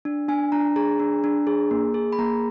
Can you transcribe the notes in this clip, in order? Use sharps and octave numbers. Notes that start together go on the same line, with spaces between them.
D4
D4 G#5
D4 A#5
G#4 A#5
D4
D4
G#4
A#3
G#4
B5
A#3 A#5